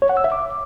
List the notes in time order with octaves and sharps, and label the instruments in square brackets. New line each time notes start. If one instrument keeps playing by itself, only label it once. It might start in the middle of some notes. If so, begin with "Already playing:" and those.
[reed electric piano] C#5
F#5
E6
E5
D6